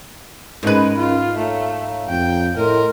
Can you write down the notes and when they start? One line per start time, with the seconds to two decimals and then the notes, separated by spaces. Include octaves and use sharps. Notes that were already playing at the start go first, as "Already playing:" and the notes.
0.63 G#2 G#3 C#4 A#4 B4
0.98 F4
1.38 A3 C#5 F5 A#5
2.09 F2 G5
2.57 A2 A#4 D#5 C6